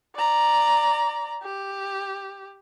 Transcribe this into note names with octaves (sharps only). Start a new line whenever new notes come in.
D5 A#5
G4